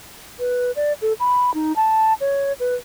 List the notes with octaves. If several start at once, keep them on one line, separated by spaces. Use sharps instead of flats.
B4
D5
A4
B5
D#4
A5
C#5
B4